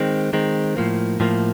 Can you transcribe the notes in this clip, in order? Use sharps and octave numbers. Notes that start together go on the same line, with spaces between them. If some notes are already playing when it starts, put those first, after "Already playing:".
Already playing: D#3 G#3 C4
D#3 G#3 C4
A2 F3 A#3
A2 F3 A#3